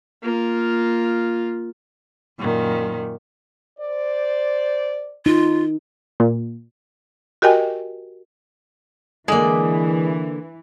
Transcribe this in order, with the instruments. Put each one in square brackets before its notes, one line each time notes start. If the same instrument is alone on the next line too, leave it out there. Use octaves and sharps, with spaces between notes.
[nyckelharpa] A#3 F4
[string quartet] F#2 A#2 D#3
[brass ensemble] C5 D5
[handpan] D#4 [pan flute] F4
[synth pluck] A#2
[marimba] F#4 G4 A#4 D#5 G5 G#5
[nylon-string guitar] D3 A#3 [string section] E3 [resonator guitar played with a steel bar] G#3 D5